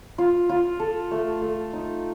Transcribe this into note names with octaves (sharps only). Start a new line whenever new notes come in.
F4
F4
A4
A3
A3
D#4